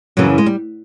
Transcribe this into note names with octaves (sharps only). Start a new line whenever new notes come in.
F#2 C#3 E3 F#3
G#3
G3